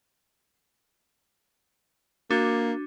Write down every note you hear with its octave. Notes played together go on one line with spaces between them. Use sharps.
A#3 D4 F#4